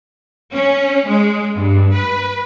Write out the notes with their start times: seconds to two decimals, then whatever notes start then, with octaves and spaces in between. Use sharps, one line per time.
0.54 C#4
1.08 G#3
1.55 G2
1.95 B4